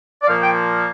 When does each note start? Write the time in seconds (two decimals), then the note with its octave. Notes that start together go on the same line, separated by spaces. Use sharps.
0.22 D5
0.27 A#2 F3 A#3 F5
0.41 G5